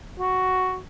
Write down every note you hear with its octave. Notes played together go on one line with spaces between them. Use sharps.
F#4